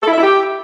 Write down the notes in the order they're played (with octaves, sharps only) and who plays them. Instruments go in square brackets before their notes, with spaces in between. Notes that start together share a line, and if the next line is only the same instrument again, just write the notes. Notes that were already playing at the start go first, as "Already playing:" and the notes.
[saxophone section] A4
E4
E5
E4
G4